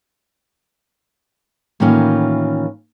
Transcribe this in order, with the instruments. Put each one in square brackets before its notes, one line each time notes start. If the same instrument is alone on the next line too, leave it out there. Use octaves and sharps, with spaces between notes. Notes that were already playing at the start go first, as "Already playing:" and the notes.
[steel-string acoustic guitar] A2 D#3 E3 A#3 C#4 F4